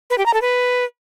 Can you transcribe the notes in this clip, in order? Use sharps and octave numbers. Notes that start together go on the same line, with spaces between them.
B4
G4
A#5
A4
B4